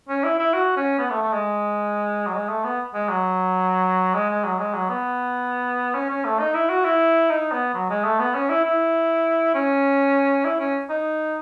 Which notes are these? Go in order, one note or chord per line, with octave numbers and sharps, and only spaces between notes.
C#4
E4
E4
F#4
C#4
B3
A3
A3
G#3
F#3
G#3
A3
B3
G#3
F#3
G#3
G#3
F#3
G#3
F#3
B3
C#4
C#4
A3
D#4
E4
F#4
E4
D#4
B3
F#3
G#3
A3
B3
C#4
E4
E4
C#4
E4
C#4
D#4